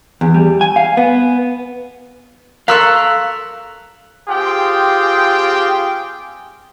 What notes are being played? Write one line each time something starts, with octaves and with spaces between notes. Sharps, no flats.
E2
G3
G#5
F5
B3
A4 A#4 F5 C6 C#6 E6 F#6 B6
C4 F4 G4 G#4 G5